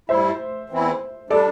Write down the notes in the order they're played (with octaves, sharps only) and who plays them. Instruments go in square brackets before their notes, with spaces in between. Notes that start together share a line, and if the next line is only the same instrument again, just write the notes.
[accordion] G2 G3 E4 [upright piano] C5 E5
[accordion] E2 E3 C4 E4
[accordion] G3 D4 [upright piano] A4 D5